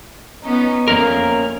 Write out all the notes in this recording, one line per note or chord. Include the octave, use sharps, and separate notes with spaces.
B3 C#4 D#4
F2 A#3 C#4 A#4